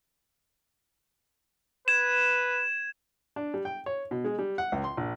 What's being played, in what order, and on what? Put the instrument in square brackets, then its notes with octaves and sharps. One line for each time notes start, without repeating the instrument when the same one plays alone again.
[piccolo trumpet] B4 [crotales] G#6 E7
[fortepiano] D4
G3
G5
C#5
B2
G#3
G3
F#5
C#2
C6
A#1